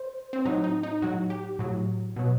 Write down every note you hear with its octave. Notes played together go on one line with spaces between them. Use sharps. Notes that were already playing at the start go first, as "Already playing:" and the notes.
Already playing: C5
C4
A2 F#3 D#4
D#4
D#4
A2 F#3 F#4
G4
A2 F#3
B2 F#3